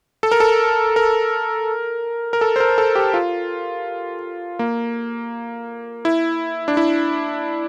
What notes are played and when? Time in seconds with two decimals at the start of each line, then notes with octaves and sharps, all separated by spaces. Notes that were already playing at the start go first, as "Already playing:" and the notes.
0.23 A4
0.31 A#4
0.40 A4
0.96 A#4
2.33 A#4
2.41 A4
2.56 C5
2.60 A#4
2.78 A4
2.95 G4
3.14 F4
4.59 A#3
6.05 E4
6.68 D4
6.77 E4